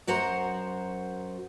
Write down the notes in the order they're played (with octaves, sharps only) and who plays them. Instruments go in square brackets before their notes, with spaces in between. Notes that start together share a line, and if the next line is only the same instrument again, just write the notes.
[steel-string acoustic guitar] F#2 F#4 C5 F#5 A#5